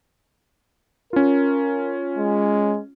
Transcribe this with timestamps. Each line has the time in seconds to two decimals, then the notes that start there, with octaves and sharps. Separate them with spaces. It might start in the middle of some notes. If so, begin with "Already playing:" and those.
1.13 C#4 F4 A#4
2.18 G#3